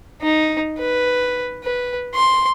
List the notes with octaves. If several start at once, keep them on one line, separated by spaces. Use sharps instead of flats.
D#4
B4
B4
C6